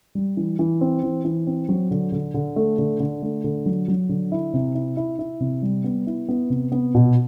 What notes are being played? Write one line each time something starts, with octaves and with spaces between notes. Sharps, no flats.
G3
E3
E3
C4
E3
E3
C4
F#3
D3
D3
D3
A3
D3
D3
A3
D3
F#3
F#3
D3
E4
C3
E4
E4
E4
C3
G3
B3
E4
B3
C3
B3
B2